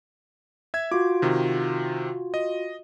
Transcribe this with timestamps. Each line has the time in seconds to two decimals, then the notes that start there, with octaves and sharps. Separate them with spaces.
0.74 E5 G#6
0.91 F4 F#4 D6
1.22 C3 D#3
2.34 D#5